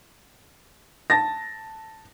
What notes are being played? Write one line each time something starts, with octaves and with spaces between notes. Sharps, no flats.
A5 A6 A#6